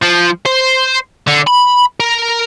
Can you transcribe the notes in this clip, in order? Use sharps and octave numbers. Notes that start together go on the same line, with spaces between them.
F3
C5
D3
B5
A#4